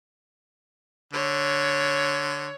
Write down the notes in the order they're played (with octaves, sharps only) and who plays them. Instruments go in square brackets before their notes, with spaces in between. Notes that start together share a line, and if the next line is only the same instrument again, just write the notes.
[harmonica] D3 [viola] C#5